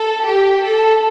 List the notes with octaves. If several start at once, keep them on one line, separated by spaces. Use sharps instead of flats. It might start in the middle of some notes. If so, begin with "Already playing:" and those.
Already playing: A4
G4
A4